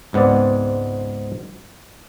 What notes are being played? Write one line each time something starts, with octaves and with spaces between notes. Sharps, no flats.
C#2 G#2 B3 C4 D5